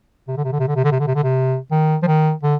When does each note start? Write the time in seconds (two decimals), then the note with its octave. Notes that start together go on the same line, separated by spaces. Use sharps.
0.28 C3
0.37 D3
0.44 C3
0.52 D3
0.60 C3
0.68 D3
0.76 C3
0.84 D3
0.92 C3
1.00 D3
1.07 C3
1.15 D3
1.23 C3
1.71 D#3
2.03 F3
2.07 D#3
2.43 D3